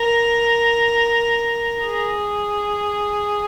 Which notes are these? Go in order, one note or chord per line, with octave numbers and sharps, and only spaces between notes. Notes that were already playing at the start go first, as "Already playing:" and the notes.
Already playing: A#4
G#4